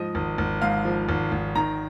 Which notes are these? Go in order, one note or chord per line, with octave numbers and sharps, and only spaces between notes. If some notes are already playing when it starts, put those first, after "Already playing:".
Already playing: G#2 F3 D#5
G#1
G#1
G#2 F5
F3
G#1
G#1
D#3 A#5